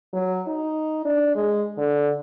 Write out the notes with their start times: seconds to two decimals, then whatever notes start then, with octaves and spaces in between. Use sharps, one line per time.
0.13 F#3
0.47 D#4
1.05 D4
1.35 G#3
1.77 D3